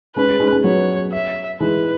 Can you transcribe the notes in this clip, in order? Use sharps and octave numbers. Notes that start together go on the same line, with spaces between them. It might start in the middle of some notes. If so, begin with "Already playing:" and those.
G#3 C#4 B4
G#3 C#4
G#3 C#4
G#3 C#4
F#3 B3 C#5
E5
E3 G#3 B4